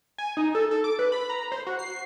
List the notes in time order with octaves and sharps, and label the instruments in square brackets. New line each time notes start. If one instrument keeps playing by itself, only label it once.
[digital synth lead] G#5
D#4
A4
A4
D6
B4
B5
A#5
C5
F#4
C7